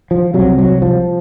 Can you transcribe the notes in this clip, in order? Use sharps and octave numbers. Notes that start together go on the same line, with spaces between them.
F3
C2 C3 F#3
F#3
F3